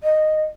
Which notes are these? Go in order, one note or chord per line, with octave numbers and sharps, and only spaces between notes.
D#5